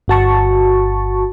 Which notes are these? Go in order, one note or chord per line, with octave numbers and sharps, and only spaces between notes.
G1 F#4 A5 C#6